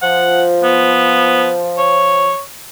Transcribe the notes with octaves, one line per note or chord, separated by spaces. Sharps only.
F3 F#5
B3
C#5